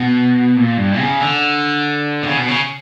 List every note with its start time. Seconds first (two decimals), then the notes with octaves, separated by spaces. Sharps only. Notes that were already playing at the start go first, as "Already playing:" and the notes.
Already playing: B2
0.56 A#2
0.77 G2
0.99 C#3
1.21 D3
2.23 B2
2.27 C#3
2.38 B2
2.48 C#3